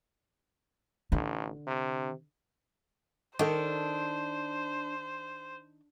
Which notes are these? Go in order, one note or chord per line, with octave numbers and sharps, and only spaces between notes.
A1 D3
C3
D#3 D4 A4 A#4 C5